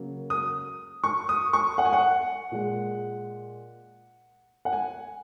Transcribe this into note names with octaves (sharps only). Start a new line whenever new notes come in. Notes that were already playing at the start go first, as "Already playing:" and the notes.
Already playing: C#3 F#3 A#3
D#6
C#6
D#6
C#6
F#5
G#5
F#5
A#2 G#3
F#5
G#5